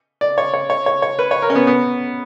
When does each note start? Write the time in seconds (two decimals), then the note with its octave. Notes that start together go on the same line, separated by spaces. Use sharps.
0.21 D5
0.38 C#5
0.54 C#5
0.70 C#5
0.86 C#5
1.02 C#5
1.19 B4
1.31 C#5
1.42 A#4
1.50 C#4
1.55 B3
1.67 B3